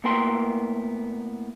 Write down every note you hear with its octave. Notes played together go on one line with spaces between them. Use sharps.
A2 A#3 B3 A#4 G5 C6